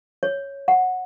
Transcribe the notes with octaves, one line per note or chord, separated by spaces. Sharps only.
C#5
F#5